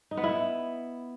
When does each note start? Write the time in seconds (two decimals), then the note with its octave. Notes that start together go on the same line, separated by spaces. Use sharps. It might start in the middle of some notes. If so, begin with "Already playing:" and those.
0.11 D#4
0.17 B3
0.24 E4